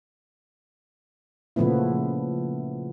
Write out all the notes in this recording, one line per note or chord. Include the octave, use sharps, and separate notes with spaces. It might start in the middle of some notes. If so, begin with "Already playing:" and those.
A#2 C#3 F3 A3 B3 E4